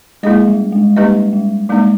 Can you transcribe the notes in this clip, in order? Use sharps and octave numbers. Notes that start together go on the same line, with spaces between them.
G#3 A#3 E4 G#4 D#5
G3
G#3
G3 A#3 D#4 G4 B4 D#5
G3
G3 G#3 A#3 D#4